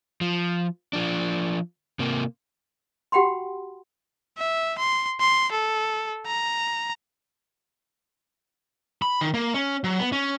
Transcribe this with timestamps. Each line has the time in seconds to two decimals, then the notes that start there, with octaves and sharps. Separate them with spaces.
0.21 F3
0.93 F3 D4
1.99 C3 A#3
3.12 F#4 G4 F#5 G5 B5 C6
4.38 E5
4.78 C6
5.20 C6
5.51 A4
6.27 A#5
9.02 B5
9.21 D#3
9.34 A#3
9.54 C#4
9.84 F#3
9.99 B3
10.12 C#4